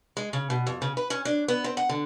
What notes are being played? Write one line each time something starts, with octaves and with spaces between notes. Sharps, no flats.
G#3
C#3
B2
F2
C#3
B4
C#4
D4
B3
C4
F#5
D3